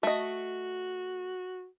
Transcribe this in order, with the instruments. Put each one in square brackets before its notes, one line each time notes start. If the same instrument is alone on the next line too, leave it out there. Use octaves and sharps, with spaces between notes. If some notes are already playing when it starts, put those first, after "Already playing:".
[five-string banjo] A3 D#5 [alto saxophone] F#4